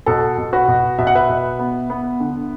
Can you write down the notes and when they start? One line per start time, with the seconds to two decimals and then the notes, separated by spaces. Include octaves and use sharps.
0.06 B2 A4
0.38 B2
0.53 F#4 B4
0.68 B2
0.98 B2 E5
1.07 F#5
1.15 B4 E5
1.29 B2
1.59 B3
1.90 B3
2.20 D3